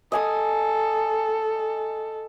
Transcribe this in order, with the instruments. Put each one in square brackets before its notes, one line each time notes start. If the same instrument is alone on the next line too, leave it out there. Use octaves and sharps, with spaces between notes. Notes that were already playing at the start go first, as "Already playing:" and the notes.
[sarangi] A4 [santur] D#5 G#5 D#6